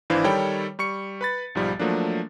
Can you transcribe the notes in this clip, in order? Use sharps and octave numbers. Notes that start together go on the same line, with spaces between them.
G#1 E3 D4 E4 C5 F5
D#3 G3 A4 C#5 G5 B5
G3 C#6 C#7
B4 B5 A6
B1 G#2 F3 G3
F3 F#3 A3 A#3 D4